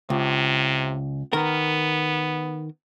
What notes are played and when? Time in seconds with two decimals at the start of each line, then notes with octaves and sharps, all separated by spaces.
0.10 C#2 C3
1.33 D#3 B3 A#4